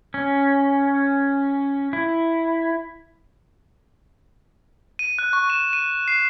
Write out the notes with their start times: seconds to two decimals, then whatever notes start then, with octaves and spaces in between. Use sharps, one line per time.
0.14 C#4
1.93 E4
4.99 D#7
5.19 F#6
5.33 C#6
5.50 E7
5.73 D#7
6.08 C7